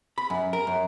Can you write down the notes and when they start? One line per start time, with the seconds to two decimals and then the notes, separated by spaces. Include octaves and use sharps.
0.18 B5
0.30 F#2
0.53 A#4
0.67 F#2